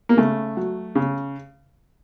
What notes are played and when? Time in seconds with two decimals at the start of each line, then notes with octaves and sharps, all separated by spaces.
0.09 A#3
0.17 C#3 A3
0.57 F#3
0.95 C#3